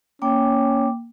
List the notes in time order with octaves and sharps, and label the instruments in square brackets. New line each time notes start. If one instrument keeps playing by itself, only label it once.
[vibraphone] A#3 G5 D6 [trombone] C#4